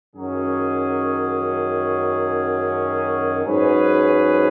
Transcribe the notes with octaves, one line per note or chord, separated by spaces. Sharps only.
F#2 D#3 F#3 C#4 G#4
G#2 F#3 C#4 G#4 B4